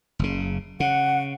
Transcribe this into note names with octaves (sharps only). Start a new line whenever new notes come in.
F#1 C#3
C#3 F#5